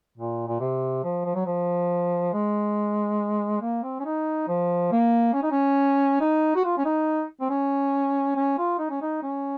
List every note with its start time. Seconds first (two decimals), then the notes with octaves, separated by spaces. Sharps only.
0.17 A#2
0.47 A#2
0.60 C3
1.04 F3
1.25 F3
1.35 F#3
1.46 F3
2.33 G#3
3.61 A#3
3.83 C4
4.00 C#4
4.05 D#4
4.48 F3
4.92 A#3
5.34 C#4
5.43 D#4
5.51 C#4
6.21 D#4
6.56 F#4
6.64 F4
6.77 C#4
6.85 D#4
7.40 C4
7.50 C#4
8.36 C#4
8.58 F4
8.79 D#4
8.90 C#4
9.02 D#4
9.23 C#4